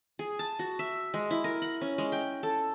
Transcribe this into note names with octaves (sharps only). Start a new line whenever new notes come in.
G#4
A5
F#4
E5
G#3
E4
A#4
F#5
C#4
G#3
G5
A4